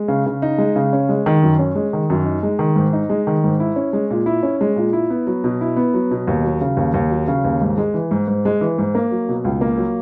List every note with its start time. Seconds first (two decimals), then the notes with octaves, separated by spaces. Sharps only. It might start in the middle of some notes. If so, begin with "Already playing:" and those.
Already playing: G#3
0.08 C#3
0.26 C#3
0.42 D#4
0.58 G#3
0.76 C#3
0.93 C#4
1.09 G#3
1.26 D#3
1.43 F#2
1.59 C#4
1.75 G#3
1.93 D#3
2.10 F#2
2.26 D#4
2.43 G#3
2.59 D#3
2.76 G#2
2.93 D#4
3.10 G#3
3.27 D#3
3.44 G#2
3.60 E4
3.76 C#4
3.93 G#3
4.10 A#2
4.26 E4
4.43 C#4
4.61 G#3
4.76 A#2
4.93 E4
5.10 B3
5.27 F#3
5.44 B2
5.61 E4
5.77 B3
5.94 F#3
6.11 B2
6.27 D#2
6.44 F#3
6.61 C#3
6.77 D#2
6.94 D#2
7.10 F#3
7.28 C#3
7.44 D#2
7.61 G#2
7.78 G#3
7.94 E3
8.11 G#2
8.27 G#2
8.45 G#3
8.61 E3
8.78 G#2
8.95 A#3
9.11 F#3
9.28 B2
9.44 C#2
9.61 A#3
9.78 F#3